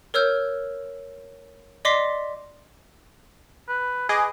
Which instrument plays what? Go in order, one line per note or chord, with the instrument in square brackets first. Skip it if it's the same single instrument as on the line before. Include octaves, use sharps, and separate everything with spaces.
[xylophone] A#4 C#5 E6 F6 G6
D5 D#5 C6 D6 B6 C7
[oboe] B4
[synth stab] G#4 D#5 D6 [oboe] B4